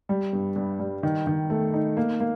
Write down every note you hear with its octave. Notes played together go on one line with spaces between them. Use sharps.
G3
G2
G2
G3
D#3
D#3
A3
D#4
A#3
A#3